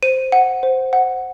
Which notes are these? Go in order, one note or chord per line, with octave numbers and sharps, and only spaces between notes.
C5 D#7
F#5
C5
F#5